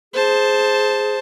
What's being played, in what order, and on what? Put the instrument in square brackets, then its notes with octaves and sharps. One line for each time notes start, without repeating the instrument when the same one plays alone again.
[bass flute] G#4 [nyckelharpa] C5 A5